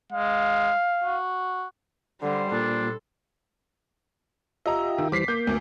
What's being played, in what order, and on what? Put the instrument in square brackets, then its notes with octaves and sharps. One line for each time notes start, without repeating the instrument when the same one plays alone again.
[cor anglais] G#3 [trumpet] F5
[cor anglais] F#4
[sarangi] D3 [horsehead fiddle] G3 C5
[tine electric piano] A#2 [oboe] D4 [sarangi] A4
[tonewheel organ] F4 G4 E5 [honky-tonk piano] D#5 A#5
[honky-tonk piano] D#3
[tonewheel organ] E3 G3 C5 [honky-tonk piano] D6 B6 C7
[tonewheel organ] A#3 [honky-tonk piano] G6
[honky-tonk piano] D2